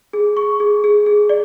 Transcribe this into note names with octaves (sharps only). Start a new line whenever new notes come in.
G#4
C#6
G#4
G#4
G#4
D5